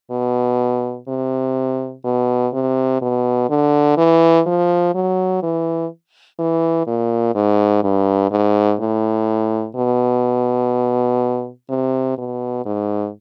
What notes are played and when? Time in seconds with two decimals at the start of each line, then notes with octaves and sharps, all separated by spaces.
0.11 B2
1.08 C3
2.04 B2
2.53 C3
3.02 B2
3.50 D3
3.97 E3
4.46 F3
4.95 F#3
5.43 E3
6.39 E3
6.87 A#2
7.35 G#2
7.83 G2
8.31 G#2
8.80 A2
9.76 B2
11.70 C3
12.18 B2
12.65 G#2